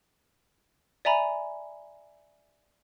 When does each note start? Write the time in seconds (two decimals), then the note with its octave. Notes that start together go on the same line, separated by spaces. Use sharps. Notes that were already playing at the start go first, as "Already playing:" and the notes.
1.05 D5 E5 G#5 A#5 B5